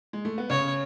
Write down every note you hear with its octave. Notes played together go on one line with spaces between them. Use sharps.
G#3
A3
B3
C#3 C#4 C#5